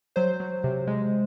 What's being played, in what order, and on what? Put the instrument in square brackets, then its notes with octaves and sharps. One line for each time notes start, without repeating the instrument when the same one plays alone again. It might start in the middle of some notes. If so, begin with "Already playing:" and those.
[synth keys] F#3 C5
F#3
C3
G#3